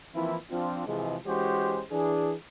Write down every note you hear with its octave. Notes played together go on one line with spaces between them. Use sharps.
E3 F3 A#3 C4 E4
F3 C4 D4 F4
C3 E3 F3 G#3
E3 G#3 C#4 F#4 G4 C5
E3 D4 G#4